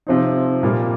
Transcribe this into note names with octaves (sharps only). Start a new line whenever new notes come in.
C3 F3 C4 D#4
A#2 G3 A#3